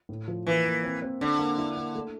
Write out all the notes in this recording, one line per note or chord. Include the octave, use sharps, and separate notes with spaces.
A2
F3
E3 A#3
A#3
C4
C4
D3 D4
A#3
E4
A#3
A3